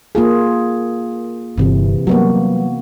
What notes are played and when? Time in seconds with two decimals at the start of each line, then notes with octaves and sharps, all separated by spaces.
0.15 A#3 F4 G#4
1.58 G1 C3 E3
2.07 F#3 G3 A#3 B3 F#4